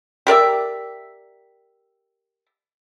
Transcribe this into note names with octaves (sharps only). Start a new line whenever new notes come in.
G4 A#4 D5 E5